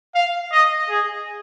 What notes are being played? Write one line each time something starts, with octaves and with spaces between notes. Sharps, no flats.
F5
D#5
G#4